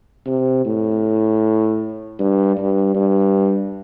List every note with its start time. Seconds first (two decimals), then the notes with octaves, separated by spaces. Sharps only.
0.26 C3
0.65 A2
2.19 G2
2.57 G2
2.95 G2